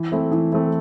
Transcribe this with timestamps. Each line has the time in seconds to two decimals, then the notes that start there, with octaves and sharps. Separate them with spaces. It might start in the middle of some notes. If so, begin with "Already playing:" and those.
Already playing: E3
0.12 A3 C4 E4
0.32 E3
0.52 A3 C4 E4